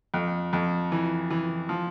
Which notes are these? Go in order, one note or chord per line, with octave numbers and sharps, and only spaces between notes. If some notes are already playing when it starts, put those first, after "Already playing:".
F2
F2
E3
E3
F3